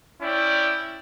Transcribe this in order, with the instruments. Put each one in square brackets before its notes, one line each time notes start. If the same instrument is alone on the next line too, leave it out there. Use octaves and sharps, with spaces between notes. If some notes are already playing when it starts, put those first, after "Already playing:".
[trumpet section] C#4 E4 D5 G5